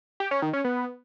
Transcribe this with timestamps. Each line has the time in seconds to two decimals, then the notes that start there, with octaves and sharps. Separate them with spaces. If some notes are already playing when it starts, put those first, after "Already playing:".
0.20 G4
0.31 C#4
0.42 D#3
0.53 C#4
0.64 B3